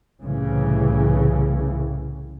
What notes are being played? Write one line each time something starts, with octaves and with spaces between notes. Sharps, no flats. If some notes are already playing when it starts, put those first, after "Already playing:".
C2 A2 C#3 E3